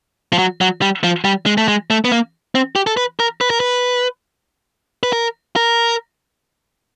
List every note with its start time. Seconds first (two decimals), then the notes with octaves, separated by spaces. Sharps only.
0.33 F3
0.39 F#3
0.61 F#3
0.82 G3
1.04 F3
1.25 G3
1.46 G#3
1.58 A3
1.68 G#3
1.90 A3
2.05 B3
2.12 A#3
2.55 C4
2.76 G4
2.87 A4
2.97 B4
3.20 A#4
3.41 B4
3.50 A#4
3.60 B4
5.03 B4
5.13 A#4
5.56 A#4